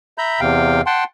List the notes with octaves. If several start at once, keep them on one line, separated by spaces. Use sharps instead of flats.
E5 A#5 B5 G6
E2 C3 F5 G5
F#5 G5 A5 C6